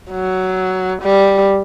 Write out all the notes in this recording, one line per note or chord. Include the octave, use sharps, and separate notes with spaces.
F#3
G3